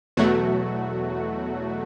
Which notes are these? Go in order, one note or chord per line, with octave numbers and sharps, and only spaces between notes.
E2 B2 F#3 A3 F#4